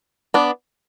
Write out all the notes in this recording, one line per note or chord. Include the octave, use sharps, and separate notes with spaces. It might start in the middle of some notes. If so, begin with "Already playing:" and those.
B3 D4